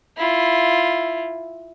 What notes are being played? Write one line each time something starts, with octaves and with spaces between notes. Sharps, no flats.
E4 F4